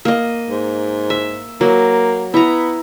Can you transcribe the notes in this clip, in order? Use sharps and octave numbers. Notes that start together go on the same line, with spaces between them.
A#3 D#5
G#2
E5
F#3 A#3
B3 E4 A#5